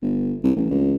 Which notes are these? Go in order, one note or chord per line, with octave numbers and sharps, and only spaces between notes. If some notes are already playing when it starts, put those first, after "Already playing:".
G1
C2
A1
C#2